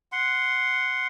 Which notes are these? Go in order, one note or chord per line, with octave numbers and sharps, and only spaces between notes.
F#5 C6